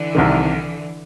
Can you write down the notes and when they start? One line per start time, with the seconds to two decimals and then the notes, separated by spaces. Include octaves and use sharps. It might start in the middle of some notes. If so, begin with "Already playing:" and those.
Already playing: D3 E3
0.15 C2 C3 D#3